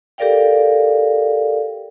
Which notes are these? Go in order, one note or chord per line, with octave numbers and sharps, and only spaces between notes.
G4 A4 A#4 D5 F5 G5